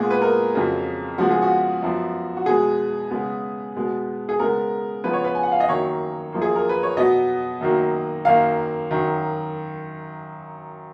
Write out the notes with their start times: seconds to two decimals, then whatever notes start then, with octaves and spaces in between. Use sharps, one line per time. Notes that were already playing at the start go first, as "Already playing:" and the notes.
Already playing: A#2 G#3 B3 G#4
0.10 B4
0.22 A#4
0.53 F2 C#3 F#3
1.18 C#3 F3 G#3 B3 F#4
1.31 G#4
1.42 F#4
1.82 F#2 F3 B3
2.37 F#4
2.46 B2 G#3 B3 G#4
3.11 C#3 G#3 B3
3.76 B2 G#3 B3
4.29 G#4
4.39 C#3 G#3 B3 A#4
5.04 C#3 F3 B3 B4
5.13 C#5
5.24 B4
5.35 G#5
5.43 F#5
5.52 F5
5.60 D#5
5.68 F#2 D#3 F#3 A#3 C#5
6.33 F#2 F3 A#3
6.42 G#4
6.56 A#4
6.69 B4
6.83 C#5
6.97 B2 F#3 B3 D#5
7.61 F#2 D#3 F#3 A#3
8.25 F#2 D#3 F#3 A#3 F5
8.90 F#2 D#3 F#3